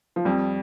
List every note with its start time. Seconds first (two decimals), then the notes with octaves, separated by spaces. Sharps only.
0.16 F3
0.25 F2 G3